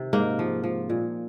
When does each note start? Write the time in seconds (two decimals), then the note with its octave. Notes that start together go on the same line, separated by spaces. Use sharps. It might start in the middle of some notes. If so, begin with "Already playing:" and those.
Already playing: C3 D#3
0.13 G#2 A#3
0.39 F3
0.64 F3
0.89 A#2